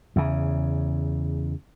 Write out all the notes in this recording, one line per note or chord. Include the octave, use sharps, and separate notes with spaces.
E2 C#3